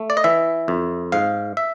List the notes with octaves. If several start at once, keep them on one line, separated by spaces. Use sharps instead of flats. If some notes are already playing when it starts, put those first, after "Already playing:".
Already playing: A3
D5
D#5
E3 E5
F2
G#2 F5
E5